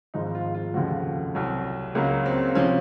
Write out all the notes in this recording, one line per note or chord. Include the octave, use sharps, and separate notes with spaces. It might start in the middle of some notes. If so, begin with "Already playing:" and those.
G#1 G#2 F3 D#4
F4
F4
F1 D#2 C#3 F3 F#4
C2 C3 F#3
C#2 C#3 F#3 A#3
C4
C4
C3 F3 C#4